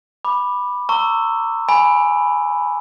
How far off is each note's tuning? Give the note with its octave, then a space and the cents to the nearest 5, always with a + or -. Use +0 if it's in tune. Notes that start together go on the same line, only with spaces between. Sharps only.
B5 -5 D6 +15
A#5 -35 C#6 +0 E6 +0
G#5 +0 B5 +0